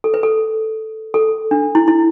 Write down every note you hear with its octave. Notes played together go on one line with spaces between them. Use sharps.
A4
B4
A4
A4
D4
E4
E4